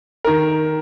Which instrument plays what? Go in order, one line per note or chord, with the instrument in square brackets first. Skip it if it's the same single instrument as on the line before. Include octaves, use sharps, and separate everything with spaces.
[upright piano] D#3 A#4